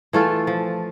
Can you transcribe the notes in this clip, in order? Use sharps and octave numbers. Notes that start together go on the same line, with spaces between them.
E3 A3 F4 A4
F3